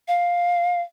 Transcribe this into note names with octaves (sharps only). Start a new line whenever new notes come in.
F5